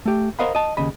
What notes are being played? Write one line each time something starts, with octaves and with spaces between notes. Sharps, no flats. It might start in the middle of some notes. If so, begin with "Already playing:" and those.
A3 G4
A#4 C5 D#5 F5 F#5 B5
D#5 A5
D#2 C#3 D#5 B5